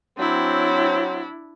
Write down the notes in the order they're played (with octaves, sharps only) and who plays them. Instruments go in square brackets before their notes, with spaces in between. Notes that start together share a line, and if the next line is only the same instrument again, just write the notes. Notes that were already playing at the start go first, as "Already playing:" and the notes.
[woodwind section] F#3 C4 [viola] D4 E4